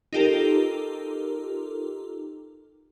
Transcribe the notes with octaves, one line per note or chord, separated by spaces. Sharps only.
D#4 F4 G4 A4 A#4